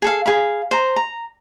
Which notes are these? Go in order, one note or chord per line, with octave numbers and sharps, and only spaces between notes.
G#4 A4 F5
G#4 F5 B5
C5 A#5
A#5